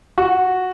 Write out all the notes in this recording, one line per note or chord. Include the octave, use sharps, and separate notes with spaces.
F#4